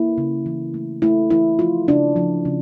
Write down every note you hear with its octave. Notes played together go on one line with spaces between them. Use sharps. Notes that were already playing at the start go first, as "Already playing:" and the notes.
Already playing: A#3 E4
C#3
E3
A3
A3 E4
E3 E4
F3 F4
C#3 D4
F3
C#3